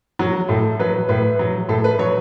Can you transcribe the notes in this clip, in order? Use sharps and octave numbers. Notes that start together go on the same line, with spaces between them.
F#3 F#4
A2 A4
F#3 B4
A2 B4
F#3
A2 A4
B4
F#3 C#5